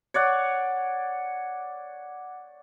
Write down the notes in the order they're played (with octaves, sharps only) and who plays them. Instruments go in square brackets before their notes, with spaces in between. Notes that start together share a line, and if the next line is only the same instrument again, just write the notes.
[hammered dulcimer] C#5 D5 F#5